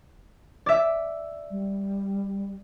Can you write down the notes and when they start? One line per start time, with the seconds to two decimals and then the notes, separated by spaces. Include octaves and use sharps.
0.66 D5 E5
1.50 G3